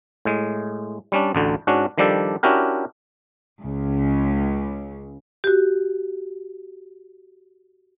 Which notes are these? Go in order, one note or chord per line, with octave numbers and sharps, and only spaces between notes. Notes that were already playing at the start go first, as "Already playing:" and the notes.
A2 G#3
G3 C#4 D4
A1 D2 D3
G#2 C#4 D4 F#4
D#3 F3 G3 D4 G4 A4
C#4 D4 E4 F#4 G4 A#4
C#2 C#3
F#4 G4